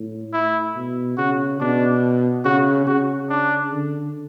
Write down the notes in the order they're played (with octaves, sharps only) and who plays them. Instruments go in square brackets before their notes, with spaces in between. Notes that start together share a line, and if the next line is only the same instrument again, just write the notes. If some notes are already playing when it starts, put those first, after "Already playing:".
Already playing: [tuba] A2
[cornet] E4
[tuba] B2
[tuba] C#3 [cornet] F#4
[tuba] B2 [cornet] D4
[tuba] C#3 [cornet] F#4
[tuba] C#3 [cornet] F#4
[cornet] D4
[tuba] D3